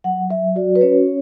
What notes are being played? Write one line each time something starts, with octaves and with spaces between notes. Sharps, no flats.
F#3 F#5
F#3 E5
F#4 D5
B4
C#4 C#5